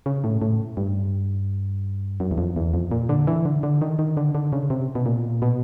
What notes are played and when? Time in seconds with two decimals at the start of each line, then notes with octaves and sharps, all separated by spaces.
0.06 C#3
0.24 A2
0.42 A2
0.77 G2
2.20 F#2
2.31 E2
2.38 F2
2.56 E2
2.74 F2
2.91 A#2
3.09 D3
3.27 E3
3.45 D3
3.63 D3
3.82 D#3
3.99 D#3
4.17 D3
4.35 D3
4.53 C#3
4.70 C3
4.95 B2
5.06 A#2
5.42 B2